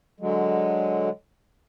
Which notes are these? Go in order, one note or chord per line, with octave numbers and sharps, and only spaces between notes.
D3 F#3 G#3